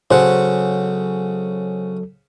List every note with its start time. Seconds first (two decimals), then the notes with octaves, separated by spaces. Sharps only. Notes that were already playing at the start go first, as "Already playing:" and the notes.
0.11 C#3 F#3 A4 C5 F#5